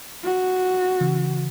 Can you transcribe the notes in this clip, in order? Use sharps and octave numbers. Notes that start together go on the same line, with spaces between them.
F#4
C#3 E3